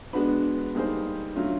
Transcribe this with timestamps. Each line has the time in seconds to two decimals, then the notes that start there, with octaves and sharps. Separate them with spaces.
0.13 G#3 B3 D4 F#4 B4
0.75 G3 A#3 D#4 G#4 C5
1.35 D3 F#3 A3 C#4 F4